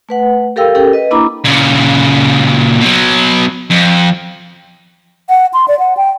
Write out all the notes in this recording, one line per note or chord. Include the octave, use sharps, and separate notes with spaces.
A3 B4 F#5
G4 A4 A#4 F5 G5 E6
C#4 G4 A4 A#4 G5
B4 D#5
A#3 D4 E4 A#5 B5 D6
A#2 C#3
B2 F#3
F2
F#5
C6
D5
F#5
G5